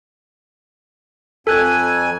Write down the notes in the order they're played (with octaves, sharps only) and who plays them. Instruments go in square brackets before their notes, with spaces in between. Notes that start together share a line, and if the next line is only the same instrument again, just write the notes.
[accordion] F2 G#5 [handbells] A4 F#6 G#6